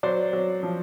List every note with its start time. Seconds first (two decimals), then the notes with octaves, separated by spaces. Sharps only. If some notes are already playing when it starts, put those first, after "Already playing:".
0.03 F#3 C5 D5
0.33 F#3
0.63 F3